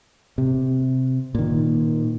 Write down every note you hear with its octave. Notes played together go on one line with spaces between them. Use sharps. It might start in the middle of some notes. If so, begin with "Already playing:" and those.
C3
A#2 D#3